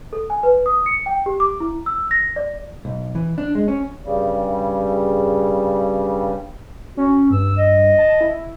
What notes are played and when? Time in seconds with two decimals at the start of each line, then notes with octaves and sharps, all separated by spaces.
0.13 A4
0.30 G#5
0.43 B4
0.66 D#6
0.86 C#7
1.06 G5
1.26 G4
1.40 D6
1.60 E4
1.86 E6
2.11 A#6
2.36 D5
2.85 B1
3.15 E3
3.38 D4
3.55 G#3
3.68 C#4
4.04 G2 C#3 G3
6.97 C#4 F#4
7.31 G2 E6
7.57 D#5
7.98 A5
8.21 E4